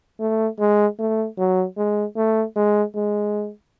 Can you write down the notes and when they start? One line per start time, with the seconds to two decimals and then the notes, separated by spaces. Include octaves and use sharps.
0.20 A3
0.59 G#3
0.99 A3
1.38 F#3
1.77 G#3
2.16 A3
2.56 G#3
2.95 G#3